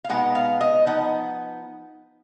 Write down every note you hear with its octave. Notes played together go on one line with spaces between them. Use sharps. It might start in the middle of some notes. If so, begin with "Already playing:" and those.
F5
B2 G#3 B3 D#4 F#5
F5
D#5
F3 B3 D#4 F#5